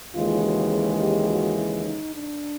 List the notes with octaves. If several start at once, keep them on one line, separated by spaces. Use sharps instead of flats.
D#2 C#3 E3 G#3 F4
F#4
G#4
G4
F#4
E4
D#4
D4